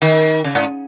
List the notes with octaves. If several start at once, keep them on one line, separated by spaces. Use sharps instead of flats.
D#3
C#3
G#2